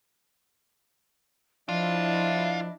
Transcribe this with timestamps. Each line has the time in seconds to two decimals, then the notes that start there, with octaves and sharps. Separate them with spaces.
1.69 F3 D4 E4 F4 D#5 E5